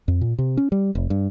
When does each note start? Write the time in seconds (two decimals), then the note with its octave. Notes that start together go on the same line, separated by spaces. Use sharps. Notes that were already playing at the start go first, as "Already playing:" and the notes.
0.08 F2
0.21 A#2
0.38 C3
0.57 C#4
0.72 G3
0.95 F1
1.10 G2